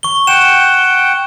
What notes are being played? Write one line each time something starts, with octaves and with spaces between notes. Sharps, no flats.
C#6 G7
F#5 G5 E7